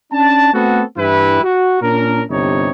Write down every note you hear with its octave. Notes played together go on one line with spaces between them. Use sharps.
C#4 D4 A5
A3 B3 C4 F#4 A4
G2 E3 G3 E4 B4
F#4
A#2 C#4 D4 A#4
G1 G2 C3 D#4 C#5